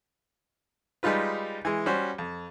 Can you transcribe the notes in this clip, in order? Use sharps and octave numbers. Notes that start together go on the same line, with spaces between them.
G3 G#3 D#4 F4 B4
E3 G#3
G3 C#4 F#4 C5
F2